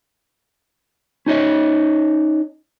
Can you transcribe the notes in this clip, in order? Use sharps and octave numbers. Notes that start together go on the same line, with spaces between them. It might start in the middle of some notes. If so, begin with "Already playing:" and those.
C#4 D#4 C#5 D#5